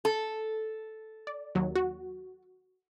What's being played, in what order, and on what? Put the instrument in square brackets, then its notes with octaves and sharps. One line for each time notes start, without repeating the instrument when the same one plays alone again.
[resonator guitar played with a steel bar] A4
[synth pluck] D5
D#2 F#3
F#4